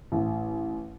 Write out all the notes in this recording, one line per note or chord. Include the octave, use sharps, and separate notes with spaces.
A1